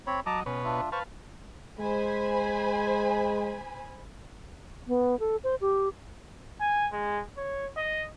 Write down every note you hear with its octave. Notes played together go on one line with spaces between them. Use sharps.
C4 C#5 B5
F#3 D#5 A5 A#5 D6
B2 C#4 B4 C#5
D4 F4 E5
B4 C5 F5 A5 C#6
G#3 C5 G#5 B5
B3
A4
C5
G4
G#5
G#3
C#5
D#5